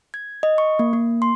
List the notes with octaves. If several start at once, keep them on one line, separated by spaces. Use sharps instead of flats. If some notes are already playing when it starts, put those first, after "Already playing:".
G#6
D#5
C#6
A#3
A#3
C6